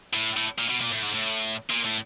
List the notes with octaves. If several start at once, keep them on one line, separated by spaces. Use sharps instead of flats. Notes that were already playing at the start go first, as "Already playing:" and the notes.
A2
A2
A#2
B2
A#2
A2
G#2
A2
A#2
A2